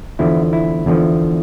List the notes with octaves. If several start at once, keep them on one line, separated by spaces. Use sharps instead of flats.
E2 D3 F3 E4
E4
E2 D3 F3